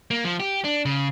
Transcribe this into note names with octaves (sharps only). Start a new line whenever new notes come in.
A#3
F3
G4
D4
C#3